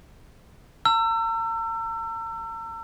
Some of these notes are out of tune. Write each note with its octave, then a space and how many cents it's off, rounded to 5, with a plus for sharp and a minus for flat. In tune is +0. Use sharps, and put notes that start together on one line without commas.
A#5 -40 E6 +30